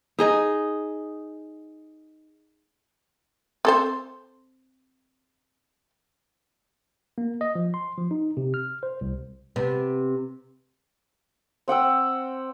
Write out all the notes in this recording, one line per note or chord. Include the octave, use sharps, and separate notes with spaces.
D#4 G#4 D#5
C4 A4 C5
A#3
D#5
F3
C6
F3
D#4
C3
F6
C5
C2
C3 B3
C4 F#5 G5 E6